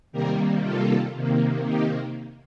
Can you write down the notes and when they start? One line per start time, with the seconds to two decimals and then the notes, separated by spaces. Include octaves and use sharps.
0.12 C3 D#3 G3 A#3 G4 A#4
0.63 F4 A4
1.15 C3 D#3 A#3
1.66 D#4 G4